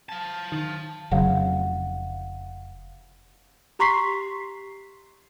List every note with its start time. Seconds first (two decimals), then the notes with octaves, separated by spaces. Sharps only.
0.09 F5 A5
0.52 D#3 A6
1.11 F1 C#3 F#3 F5 F#5
3.79 G4 A#5 C6 C#6 B6 C7